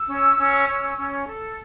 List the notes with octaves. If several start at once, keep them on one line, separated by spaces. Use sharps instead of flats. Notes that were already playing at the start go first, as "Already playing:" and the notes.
Already playing: E6
C#4
C#4
C#4
C#4
A4